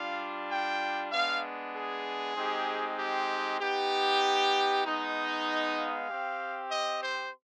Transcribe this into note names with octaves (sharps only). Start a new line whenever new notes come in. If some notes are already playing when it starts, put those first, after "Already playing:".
Already playing: G3 D4 F4 F5
G5
G#3 B3 D4 F5
G#4
G#3 C4 D#4 G4
G4
B3 D#4 G4
G#3 B3 D#4
F5
C4 G4
D#5
C5